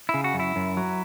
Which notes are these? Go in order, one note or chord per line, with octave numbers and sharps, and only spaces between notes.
E4
C#3
F#4
F#2
E4
F#2
F#3